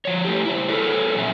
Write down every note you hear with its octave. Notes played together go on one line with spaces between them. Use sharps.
F3 C#5
A3 E4 G4
E4 C5
G#4 A4 B4 C#5
F2 A#2 F#3 B3 C#4 E5